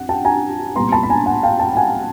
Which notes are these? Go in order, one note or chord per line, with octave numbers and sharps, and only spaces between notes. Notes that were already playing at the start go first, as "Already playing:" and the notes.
Already playing: F2 F#5
G5 A5
G#5 A#5
C2 A#2 G3 B3 A#5 C6
A5 B5
B5
G#5 A#5
F#5 G#5
F5 G5
G5 A5
G5
F#5 G#5